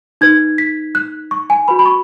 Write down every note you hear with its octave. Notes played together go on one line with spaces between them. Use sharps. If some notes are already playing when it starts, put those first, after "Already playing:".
D#4 B4 G#6
B6
F#6
C#6
G#5
F#4 B4 B5
B5
C#6